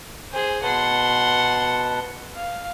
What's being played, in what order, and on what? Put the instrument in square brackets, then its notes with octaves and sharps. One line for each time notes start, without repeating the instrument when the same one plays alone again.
[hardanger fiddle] G#4 C5
[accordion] B2 B4 A5 [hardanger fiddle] F#5 C6
[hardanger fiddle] F5